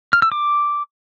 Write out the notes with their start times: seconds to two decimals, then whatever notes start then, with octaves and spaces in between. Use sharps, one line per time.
0.13 F6
0.22 E6
0.32 D6